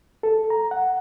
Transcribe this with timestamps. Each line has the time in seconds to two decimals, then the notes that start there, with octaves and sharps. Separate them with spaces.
0.23 A4
0.50 A#5
0.71 F#5